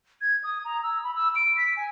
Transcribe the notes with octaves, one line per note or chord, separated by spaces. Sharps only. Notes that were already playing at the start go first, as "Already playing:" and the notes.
G#6
D#6
A#5
E6
B5
E6
D7
B6
G#5